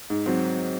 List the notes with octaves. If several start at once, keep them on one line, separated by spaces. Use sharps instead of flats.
G#2
F#3 C4